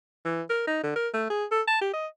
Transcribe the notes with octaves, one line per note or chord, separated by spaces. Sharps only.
E3
A#4
D#4
D3
A#4
A3
G#4
A4
A5
G4
D#5